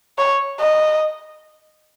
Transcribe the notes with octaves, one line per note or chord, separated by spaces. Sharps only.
C#5
D#5